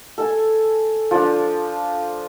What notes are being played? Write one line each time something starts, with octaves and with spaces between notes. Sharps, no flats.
A4 G#5
F3 D4